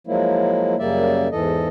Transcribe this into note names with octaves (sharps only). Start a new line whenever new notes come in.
F3 F#3 G#3 A#3 E4
F#2 C#3 G3 A#3 D5 E5
E2 G#2 E3 A4 D#5